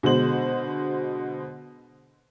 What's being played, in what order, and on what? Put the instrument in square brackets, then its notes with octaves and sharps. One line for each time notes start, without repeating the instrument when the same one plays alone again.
[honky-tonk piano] B2 D3 G#3 C5 F#7